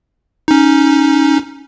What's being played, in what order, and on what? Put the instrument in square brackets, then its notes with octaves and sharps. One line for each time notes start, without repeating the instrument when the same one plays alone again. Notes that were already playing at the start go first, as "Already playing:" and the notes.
[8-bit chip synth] C#4 D#4